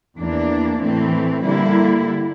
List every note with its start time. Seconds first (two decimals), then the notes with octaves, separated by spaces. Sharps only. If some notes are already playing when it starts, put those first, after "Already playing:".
0.18 E2 E3 A#3 D4
0.80 A2 E3 A3 C4
1.43 D3 G3 A#3 E4